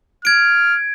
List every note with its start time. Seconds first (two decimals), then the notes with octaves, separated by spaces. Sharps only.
0.25 F6 G#6 D7